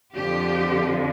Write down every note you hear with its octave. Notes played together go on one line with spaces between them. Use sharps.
F2 D3 F3 G4